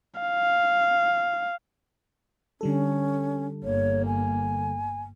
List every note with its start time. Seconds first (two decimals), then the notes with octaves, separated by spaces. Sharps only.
0.21 F5
2.61 D3 G3 C#4 A4
3.64 G1 A#3 C#5
4.07 G#5